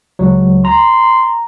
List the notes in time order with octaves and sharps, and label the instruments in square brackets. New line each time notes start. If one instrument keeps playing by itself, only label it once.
[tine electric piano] C#2 F#3
[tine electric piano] A#5 [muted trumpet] C6